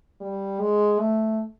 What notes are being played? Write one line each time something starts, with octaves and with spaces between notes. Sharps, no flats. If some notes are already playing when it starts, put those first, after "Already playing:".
G3
G#3
A3